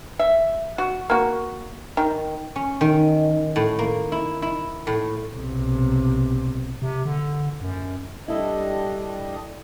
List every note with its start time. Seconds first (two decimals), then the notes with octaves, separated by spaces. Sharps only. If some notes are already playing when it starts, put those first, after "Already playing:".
0.19 E5
0.78 F#4
1.10 A#3 F#4
1.97 D#3
2.56 C#4
2.81 D#3
3.56 A2
3.79 A#3
4.12 E4
4.42 E4
4.87 A2
5.34 B1 C3
6.82 C3
7.05 D3
7.61 F#2
8.28 G3 D4 E4 A4 D#5